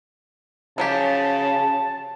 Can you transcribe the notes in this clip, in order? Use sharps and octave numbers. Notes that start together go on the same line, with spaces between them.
C#3 F3 F#3 G4 A5